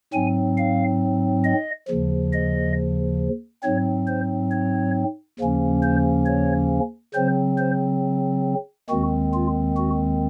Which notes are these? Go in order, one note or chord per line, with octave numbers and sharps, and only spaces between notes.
G#2 F#3 C4 G#5
F5
D#5
D#2 C#3 F3
D#5
G#2 F#3 C4 C#5
C5
C#5
D#2 C#3 F3 A#3 C#4
C5
C#5
C#3 F#3 C4 C5
C5
D#2 D#3 G#3 C4 F#4
F4
F#4